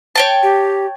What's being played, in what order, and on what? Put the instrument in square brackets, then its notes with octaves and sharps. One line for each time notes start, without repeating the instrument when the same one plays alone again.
[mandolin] C#5 G5 A5
[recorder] G4